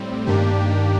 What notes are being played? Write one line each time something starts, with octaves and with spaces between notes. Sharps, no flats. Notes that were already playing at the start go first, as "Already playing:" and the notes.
Already playing: A2 G3 C4
G2 D#3 A#3 D4 G4